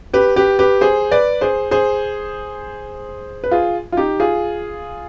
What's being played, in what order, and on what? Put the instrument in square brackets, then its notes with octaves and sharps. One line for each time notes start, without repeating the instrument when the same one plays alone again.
[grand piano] G4 B4
G4 B4
G4 B4
G#4 C5
B4 D5
G#4 C5
G#4 C5
B4
F4 G#4
F4
D#4 G4
F4 G#4